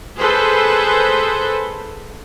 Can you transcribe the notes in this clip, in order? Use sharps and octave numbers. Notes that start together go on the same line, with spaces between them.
G#4 A4 B4 C5